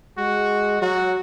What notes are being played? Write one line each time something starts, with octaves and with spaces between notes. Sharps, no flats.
G#3 F#4
F#3 F#4